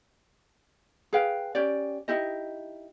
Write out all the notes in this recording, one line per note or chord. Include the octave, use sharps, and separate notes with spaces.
G#4 B4 F5 G5
C#4 G4 D5
D#4 E4 G4 D#5